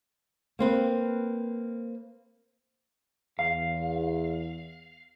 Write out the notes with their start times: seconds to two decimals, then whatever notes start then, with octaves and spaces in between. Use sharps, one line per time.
0.59 A#3 C4 B4
3.39 E2 F5